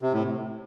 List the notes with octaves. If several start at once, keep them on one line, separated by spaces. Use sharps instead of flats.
C3
A2